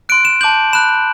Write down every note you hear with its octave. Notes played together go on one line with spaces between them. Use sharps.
C6 F#6 D7
E7
A5 D6 G6 F#7
B5 F#6 E7